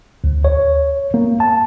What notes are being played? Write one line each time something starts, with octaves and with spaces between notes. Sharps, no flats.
D2
C#5
A#3
A5